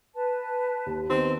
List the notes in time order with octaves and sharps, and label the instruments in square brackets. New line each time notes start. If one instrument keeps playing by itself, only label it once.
[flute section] B4 A5
[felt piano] D#2
[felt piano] D#3 B3 [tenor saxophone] C4